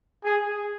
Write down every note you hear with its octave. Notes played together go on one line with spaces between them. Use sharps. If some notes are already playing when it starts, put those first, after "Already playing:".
G#4